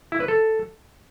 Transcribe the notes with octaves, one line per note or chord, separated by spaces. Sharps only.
E4
B4
A4